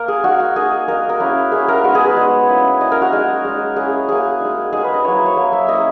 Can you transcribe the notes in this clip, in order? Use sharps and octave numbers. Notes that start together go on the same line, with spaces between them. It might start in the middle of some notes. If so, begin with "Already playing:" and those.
Already playing: A#3 A#4
G#4
A#3 D#4 F#4
F#4
A#3 D#4 G#4
A#3 D#4 A#4
A#4
A#3 C#4 E4
A#3 C#4 E4 G#4
A#4
G#3 B3 D#4 F#4
G#4
B4
G#3 B3 D#4
A#3 C#4 E4
A#3 C#4 E4 D#5
A#4
F#4
G#3 D#4 G#4
G#3 D#4
A#3 C#4 E4 G#4
A#3 C#4 E4 G#4
G#3 D#4
G#3 D#4 G#4
B4
D#5
F#3 A#3 E4 C#5
C#5
F#3 A#3 E4
E5
A#3 C#4 E4 D#5